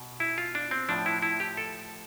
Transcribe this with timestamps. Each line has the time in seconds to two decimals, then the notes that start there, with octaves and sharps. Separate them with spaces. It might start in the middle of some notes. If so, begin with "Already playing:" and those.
Already playing: B2
0.20 E4
0.38 F4
0.55 D4
0.71 C4
0.89 A2 F3 D4
1.06 E4
1.22 E4
1.40 G4
1.57 A4